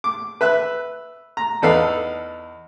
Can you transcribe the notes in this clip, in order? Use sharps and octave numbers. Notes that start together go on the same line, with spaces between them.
D6
B4 E5 F#6
A#5
E2 D#4 A4 B4 D5 F5